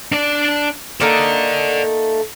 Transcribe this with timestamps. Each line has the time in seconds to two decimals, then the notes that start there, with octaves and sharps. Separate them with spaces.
0.12 D4 D5
1.00 A3 A#3 D#4 A4 D5